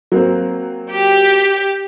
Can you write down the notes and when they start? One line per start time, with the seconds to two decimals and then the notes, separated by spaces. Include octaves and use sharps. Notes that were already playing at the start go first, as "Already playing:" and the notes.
0.12 F#3 A#3 C4
0.91 G4